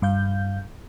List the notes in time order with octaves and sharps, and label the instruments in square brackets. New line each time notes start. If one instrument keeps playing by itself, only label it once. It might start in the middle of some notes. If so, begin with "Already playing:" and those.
[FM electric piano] G2 F5 G6